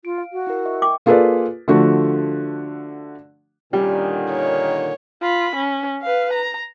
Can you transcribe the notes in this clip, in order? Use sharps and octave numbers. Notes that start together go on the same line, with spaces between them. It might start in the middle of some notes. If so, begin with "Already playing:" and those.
F4 D7
F5
F#4
E4 A#4
D#5 E5 C#6
G5 D6
A#3 F4 G#4 A4 B4 D5
D3 F3 A3 F#4
A#2 D3 D#3 G3 C#4
C#5
F4 B5
C#4
B4 F5
A#5